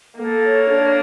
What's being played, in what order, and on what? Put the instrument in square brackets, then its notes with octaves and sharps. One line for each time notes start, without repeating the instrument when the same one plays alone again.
[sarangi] A#3 [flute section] A4
[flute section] C#5
D4